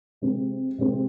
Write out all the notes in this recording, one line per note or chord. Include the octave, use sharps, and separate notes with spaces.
C3 G#3 C4
C3 G#3 C4